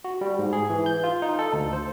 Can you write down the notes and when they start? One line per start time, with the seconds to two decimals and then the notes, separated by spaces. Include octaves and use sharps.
0.04 F#4
0.21 G3
0.39 G#2
0.53 G#4
0.70 E3
0.86 G6
1.03 F4
1.22 D#4
1.39 A4
1.53 D2
1.73 C5